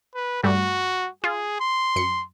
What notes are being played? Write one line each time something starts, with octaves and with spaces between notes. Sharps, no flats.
B4
G2 G3 A3 F#4
F4 G#4
C6
F#2 C#7